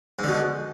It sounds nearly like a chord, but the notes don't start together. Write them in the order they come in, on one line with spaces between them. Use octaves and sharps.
G#2 D3 B2